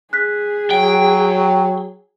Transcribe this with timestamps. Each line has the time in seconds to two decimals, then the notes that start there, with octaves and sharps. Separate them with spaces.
0.13 G#4 F#6 B6
0.71 F#3 G5